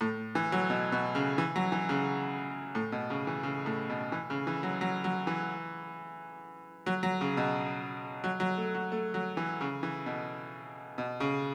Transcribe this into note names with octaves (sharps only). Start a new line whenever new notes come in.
A2
E3
F#3
B2
B2
C#3
E3
F#3
E3
C#3
A2
B2
C#3
E3
C#3
A2
B2
E3
C#3
E3
F#3
F#3
F#3
E3
F#3
F#3
C#3
B2
F#3
F#3
A3
F#3
A3
F#3
E3
C#3
E3
B2
B2
C#3